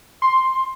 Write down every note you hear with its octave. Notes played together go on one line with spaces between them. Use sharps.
C6